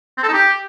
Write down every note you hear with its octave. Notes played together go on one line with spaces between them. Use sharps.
C4
A4
D#4
G4